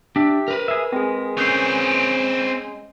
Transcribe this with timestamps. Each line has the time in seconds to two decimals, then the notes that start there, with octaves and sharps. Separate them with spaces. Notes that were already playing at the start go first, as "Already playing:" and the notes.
0.16 D4 G4 E5
0.48 A#4 B4
0.68 G#4 E5
0.92 G#3 C4 G#4
1.37 C4 C#4 C#5 G6 C7